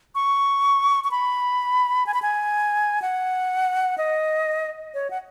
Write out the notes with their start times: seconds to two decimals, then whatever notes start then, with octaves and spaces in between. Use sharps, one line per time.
0.15 C#6
1.04 C#6
1.11 B5
2.07 G#5
2.14 B5
2.22 G#5
3.02 F#5
3.98 D#5
4.94 C#5
5.10 F#5